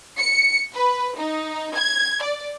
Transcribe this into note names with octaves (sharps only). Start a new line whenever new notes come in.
C#7
B4
D#4
G#6
D5